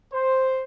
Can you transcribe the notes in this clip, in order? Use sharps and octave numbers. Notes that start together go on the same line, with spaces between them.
C5